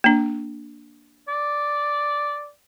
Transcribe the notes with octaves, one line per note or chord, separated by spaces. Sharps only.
A#3 D4
D5